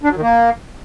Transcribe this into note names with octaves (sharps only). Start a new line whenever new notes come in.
D4
F#3
D#3
A#3